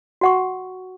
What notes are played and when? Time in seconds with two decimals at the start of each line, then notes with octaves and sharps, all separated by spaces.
0.21 F#4 F#5 C#6